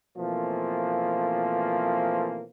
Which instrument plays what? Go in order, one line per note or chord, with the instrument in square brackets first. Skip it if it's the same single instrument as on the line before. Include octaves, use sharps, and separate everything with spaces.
[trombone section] B2 E3 F3 A3 A#3 C4